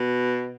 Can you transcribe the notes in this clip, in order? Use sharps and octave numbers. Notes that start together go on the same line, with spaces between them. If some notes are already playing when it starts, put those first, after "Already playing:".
Already playing: B2